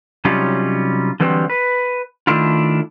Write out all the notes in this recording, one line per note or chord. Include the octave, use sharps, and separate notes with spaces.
C3 F#3 G3 C#4 D#4 F4
D3 E3 F#3 G3 B3 C4
B4
D#3 A3 D4 E4 F4